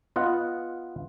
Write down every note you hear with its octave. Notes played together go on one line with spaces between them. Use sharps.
B3 F4 D#5 F#5